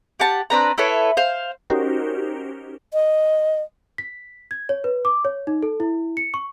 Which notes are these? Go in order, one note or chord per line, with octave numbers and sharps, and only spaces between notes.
G4 F#5 A5
C4 D4 B4 A#5
E4 A4 B4 C#5
C5 F5
C#4 D#4 F#4 G4 A#4 C5
D#5
B6
G#6
C#5
B4
D6
C#5
D#4
A4
E4
C#7
C#6